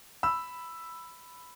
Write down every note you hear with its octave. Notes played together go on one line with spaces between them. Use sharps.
B5 E6